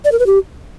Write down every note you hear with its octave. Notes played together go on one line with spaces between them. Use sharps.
D5
A#4
B4
G4